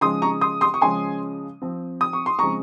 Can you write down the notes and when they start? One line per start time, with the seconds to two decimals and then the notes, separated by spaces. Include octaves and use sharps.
0.01 C#3 F3 G#3 C6 D#6
0.22 A#5 C#6
0.41 C6 D#6
0.61 C6 D#6
0.74 C#6
0.81 C#3 F3 G#3 C#4 G#5 C6
1.62 F3 C4
2.01 D#6
2.13 C#6
2.26 C6
2.39 C#3 F3 G#3 C4 A#5 C#6